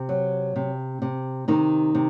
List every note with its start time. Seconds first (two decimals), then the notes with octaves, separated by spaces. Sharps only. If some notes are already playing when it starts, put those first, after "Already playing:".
Already playing: C3 C4
0.09 F#3
0.56 C3
1.02 C3
1.48 C3 D#3 D#4
1.95 C3